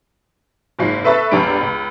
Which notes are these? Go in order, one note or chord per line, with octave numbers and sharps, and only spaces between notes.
F#1 G#2 F4 C7
A4 B4 E5 C#6 E6 A6
G1 C#2 G3 D4 D7
C#2